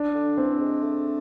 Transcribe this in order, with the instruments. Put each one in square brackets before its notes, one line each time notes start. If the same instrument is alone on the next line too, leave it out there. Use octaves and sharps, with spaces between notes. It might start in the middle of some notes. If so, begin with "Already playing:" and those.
Already playing: [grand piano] D4
[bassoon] D3
[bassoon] E3 [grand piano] C4
[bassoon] G#3
A3